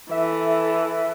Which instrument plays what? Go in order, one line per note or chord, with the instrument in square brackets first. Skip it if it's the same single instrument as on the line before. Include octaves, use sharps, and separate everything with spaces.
[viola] E3 A4 [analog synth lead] E5